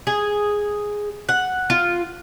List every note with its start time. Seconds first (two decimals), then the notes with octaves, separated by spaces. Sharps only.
0.07 G#4
1.29 F#5
1.70 F4